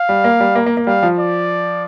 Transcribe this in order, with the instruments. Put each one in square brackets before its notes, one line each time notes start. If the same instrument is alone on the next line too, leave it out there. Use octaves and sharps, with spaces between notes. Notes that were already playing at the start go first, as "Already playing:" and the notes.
Already playing: [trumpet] F5
[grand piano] G3
A#3
G3
A#3
A#3
A#3
[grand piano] G3 [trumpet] F5
[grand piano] F3
[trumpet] D5